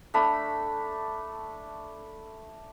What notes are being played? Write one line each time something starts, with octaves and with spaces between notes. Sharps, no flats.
A3 D4 B5